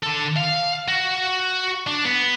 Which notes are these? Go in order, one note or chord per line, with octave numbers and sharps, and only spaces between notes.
D3 A4
F5
F#4
D4
B3